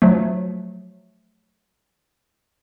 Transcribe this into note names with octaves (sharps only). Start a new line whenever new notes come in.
F3 F#3 A3